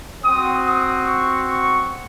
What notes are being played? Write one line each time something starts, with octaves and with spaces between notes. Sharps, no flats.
C4 F#4 D#6
D#6
C#6
C#6